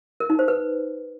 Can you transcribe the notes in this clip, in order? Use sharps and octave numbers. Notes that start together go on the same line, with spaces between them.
A#4
D#4
C5
B4